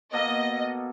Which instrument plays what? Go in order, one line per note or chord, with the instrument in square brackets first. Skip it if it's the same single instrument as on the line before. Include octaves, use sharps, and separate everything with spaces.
[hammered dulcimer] B2 A#3 A4 [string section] D#5